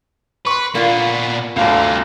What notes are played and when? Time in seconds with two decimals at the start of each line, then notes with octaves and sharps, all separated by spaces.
0.47 B4 C6 C#6
0.75 A#2 A#3 B3 F4 D5
1.56 G1 D2 C3 A#3 F5